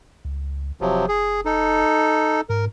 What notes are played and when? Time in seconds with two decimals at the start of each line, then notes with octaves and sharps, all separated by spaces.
0.25 C#2
0.81 F1 C3 F3 F#3
1.08 G#4
1.45 D#4 A4
2.49 G#2 A#4